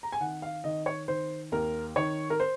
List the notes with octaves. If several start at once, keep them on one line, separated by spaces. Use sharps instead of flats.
A#5
G#5
D#3 F#5
F5
D#3 D#5
C#5
D#3 C5
D#2 A#4
D#3 C#5
A#4
C5